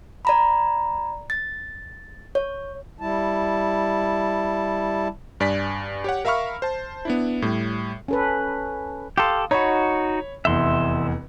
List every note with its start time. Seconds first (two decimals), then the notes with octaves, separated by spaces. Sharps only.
0.25 D5 A#5 B5
1.30 A6
2.35 C#5
3.00 G3 E4 A5
5.40 G2 D5 G#5 B6
6.04 G4 C#5 F#5
6.25 A#4 E5 F5 B5 C#6 F6
6.62 C5 A5
7.05 B3 D4 E4
7.42 A2 G3
8.08 C#4 A4 B4
9.18 G4 A4 F5 C6 D#6
9.51 D#4 F#4 C#5 B5
10.45 F1 E2 E5 C6